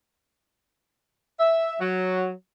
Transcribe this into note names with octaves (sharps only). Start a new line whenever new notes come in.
E5
F#3